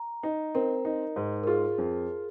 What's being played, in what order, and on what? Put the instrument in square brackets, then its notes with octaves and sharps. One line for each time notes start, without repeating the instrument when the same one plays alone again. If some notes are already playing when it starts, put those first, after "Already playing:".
Already playing: [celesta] A#5
[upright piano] D#4
[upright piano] C4 [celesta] A#4
[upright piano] D#4
G#2
[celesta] A#4
[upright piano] F4 [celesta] G#4
[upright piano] F2